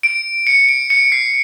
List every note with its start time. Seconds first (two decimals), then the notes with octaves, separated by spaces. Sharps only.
0.03 D7
0.47 C#7
0.69 D7
0.90 C#7
1.12 C7